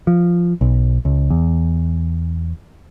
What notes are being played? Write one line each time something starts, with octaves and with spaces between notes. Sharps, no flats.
F3
B1
C#2
E2